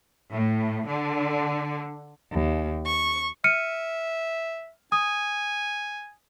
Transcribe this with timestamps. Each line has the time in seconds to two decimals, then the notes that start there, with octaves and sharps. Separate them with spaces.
0.32 A2
0.87 D3
2.32 D#2
2.86 C#6
3.44 E5 F6 C#7 D#7
4.92 G#5 D#6